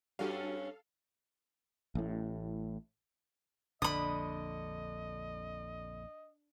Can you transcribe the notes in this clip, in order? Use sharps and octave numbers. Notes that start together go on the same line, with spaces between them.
G2 G3 C#4 F#4 G4 A4 F5
A1 A2
A#1 F2 D3 D#5 B5 D#6